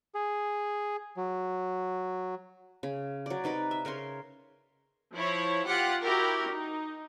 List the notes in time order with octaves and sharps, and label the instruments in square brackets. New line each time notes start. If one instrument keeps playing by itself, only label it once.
[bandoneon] G#4
F#3
[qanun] C#3
F#3 D5
C3 D#4 B4 D5
E5
C#3 A#4 C#5 C6
[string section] F3 E4 C#5
F4 G4 F#5
E4 F#4 G4 A#4
D#4